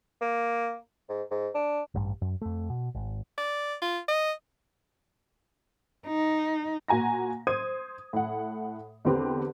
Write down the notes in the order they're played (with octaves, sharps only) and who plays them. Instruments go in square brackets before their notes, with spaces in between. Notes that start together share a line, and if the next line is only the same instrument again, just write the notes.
[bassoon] A#3
G#2
G#2
D4
[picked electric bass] A1 G2
F#2
F2 A3
B2
G#1
[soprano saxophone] D5
F4
D#5
[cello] D#4
[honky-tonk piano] A#2 F#4 G#5 A#5 A#6
C5 D#6 G#6 D#7
A2 F#5
E2 D3 C4 G4 B4